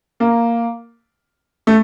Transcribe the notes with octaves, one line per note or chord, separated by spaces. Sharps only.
A#3
A3